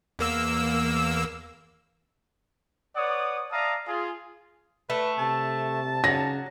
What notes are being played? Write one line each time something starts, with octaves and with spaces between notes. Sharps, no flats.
E2 A#3 E6
B4 C#5 D5 F#5 D#6
D5 E5 F5 A5 A#5 D#6
F4 G#4
A3 B4
C3 A5
C#3 F#3 A#6